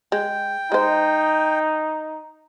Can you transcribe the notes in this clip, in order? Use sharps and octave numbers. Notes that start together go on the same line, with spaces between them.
G#3 G5
G#3 D#4 C5